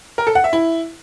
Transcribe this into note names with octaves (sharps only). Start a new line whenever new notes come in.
A#4
A4
F#5
E5
E4